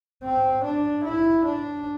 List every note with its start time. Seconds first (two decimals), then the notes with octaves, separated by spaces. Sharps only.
0.23 C4
0.64 D4
1.04 E4
1.45 D4